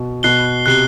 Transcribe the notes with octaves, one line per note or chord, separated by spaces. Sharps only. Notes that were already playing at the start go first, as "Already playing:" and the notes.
Already playing: B2
B2 F#6 C7 G7
C3 F#6 C7 G7